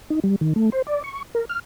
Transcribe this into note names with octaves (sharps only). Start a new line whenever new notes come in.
D#4
G3
D#3
A3
C5
D5
C#6
A#4
F6